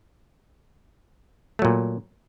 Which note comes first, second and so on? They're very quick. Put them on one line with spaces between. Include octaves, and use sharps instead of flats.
A3 F#3 A#2